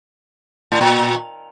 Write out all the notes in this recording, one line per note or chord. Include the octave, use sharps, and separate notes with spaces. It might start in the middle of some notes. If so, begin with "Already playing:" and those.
A2
A#2